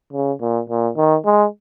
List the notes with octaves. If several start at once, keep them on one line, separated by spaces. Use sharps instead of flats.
C#3
A#2
A#2
D#3
G#3